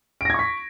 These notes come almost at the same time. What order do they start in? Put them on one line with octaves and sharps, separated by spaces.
D7 A#6 G#6 C#6 B6